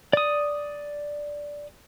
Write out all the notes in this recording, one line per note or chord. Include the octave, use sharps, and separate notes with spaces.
D5 D#6